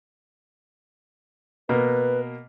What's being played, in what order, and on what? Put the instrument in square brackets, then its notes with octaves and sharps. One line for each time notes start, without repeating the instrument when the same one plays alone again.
[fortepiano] B2 A#3 [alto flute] B4